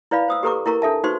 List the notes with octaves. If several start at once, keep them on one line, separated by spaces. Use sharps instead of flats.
E4 B4 D5 F5 B5
C5 D#6 E6
G4 A4 B4 A#5 C#6 D6
E4 A#4 A#5 C#6
D4 A4 E5 A5
D#4 F#4 B4 C5 C6 C#6